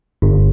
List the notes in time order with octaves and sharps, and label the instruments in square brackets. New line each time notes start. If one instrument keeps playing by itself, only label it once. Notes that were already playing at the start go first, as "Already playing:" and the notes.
[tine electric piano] G1